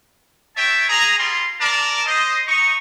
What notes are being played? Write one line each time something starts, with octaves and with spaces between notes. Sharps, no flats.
C#5 E5 G5 A5
G#4 A#5
G3 F4 C6
A#4 D5 A5
C5 D#5
D#4 C#6